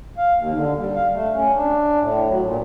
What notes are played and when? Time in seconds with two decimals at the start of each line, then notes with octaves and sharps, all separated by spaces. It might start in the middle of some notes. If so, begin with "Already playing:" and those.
0.18 F5
0.38 D#2
0.55 D3
0.77 G3
0.95 F5
1.13 A3
1.34 C#4
1.54 D4
2.00 A2
2.29 F#3
2.43 A#2